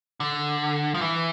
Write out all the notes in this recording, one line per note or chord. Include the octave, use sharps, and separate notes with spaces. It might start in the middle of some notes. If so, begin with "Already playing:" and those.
D3
F3
E3